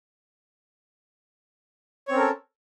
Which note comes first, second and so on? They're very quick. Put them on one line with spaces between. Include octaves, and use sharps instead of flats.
C#5 C4 C#4 A#4 A4